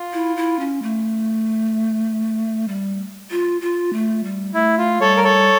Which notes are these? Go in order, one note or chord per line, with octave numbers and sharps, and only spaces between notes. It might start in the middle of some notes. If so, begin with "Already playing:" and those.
Already playing: F4
E4
E4
C#4
A3
G3
F4
F4
A3
G3
A3 E4
F4
G3 A4 C#5
A#4
A4 C#5